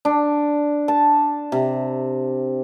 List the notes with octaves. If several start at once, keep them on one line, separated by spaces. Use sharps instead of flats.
D4
A5
C3